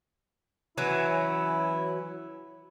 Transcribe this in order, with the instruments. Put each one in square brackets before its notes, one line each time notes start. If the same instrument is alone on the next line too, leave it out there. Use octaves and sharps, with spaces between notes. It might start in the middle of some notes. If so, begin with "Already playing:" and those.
[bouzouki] E3 F#3 C#4 [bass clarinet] E4